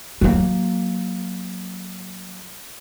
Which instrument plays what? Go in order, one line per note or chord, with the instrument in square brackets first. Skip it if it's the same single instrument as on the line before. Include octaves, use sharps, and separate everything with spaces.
[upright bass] F#3 A#3